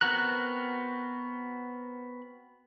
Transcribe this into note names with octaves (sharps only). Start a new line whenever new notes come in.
B3 C4 F#4 A#4 F#6